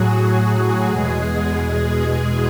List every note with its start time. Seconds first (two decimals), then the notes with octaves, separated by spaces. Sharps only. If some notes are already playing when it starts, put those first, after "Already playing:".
Already playing: A2 F#3 F#4 G#4
0.89 E2 B2 G#3 G#4